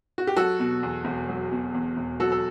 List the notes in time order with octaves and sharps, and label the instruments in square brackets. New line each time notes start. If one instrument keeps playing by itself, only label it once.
[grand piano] F#4
G4
F#3 F#4 A4
B2
E2
E1
F#3
B2
E2
E1
F#3 F#4 A4
A4